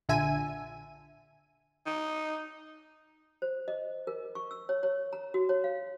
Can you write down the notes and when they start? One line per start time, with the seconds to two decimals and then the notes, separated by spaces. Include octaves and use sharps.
0.09 A#1 D3 E5 G#5 D#7
1.86 D#4
3.42 C5
3.68 D#5
4.07 A#4
4.35 C#6
4.51 E6
4.69 C#5
4.83 C#5
5.13 A#5
5.34 F#4
5.49 C#5
5.64 F5